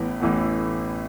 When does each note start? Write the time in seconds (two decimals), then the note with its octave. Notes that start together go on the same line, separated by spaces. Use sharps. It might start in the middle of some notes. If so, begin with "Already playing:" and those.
Already playing: A1 A2 E3 B3
0.20 A1 A2 E3 B3